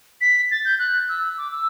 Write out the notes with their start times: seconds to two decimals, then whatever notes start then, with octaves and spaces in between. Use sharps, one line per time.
0.21 B6
0.51 A6
0.65 G6
0.79 F#6
1.09 E6
1.38 D6
1.52 E6